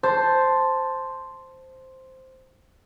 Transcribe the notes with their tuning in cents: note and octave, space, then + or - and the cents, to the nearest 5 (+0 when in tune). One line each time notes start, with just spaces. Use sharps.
C5 +0 A5 +0 C6 +0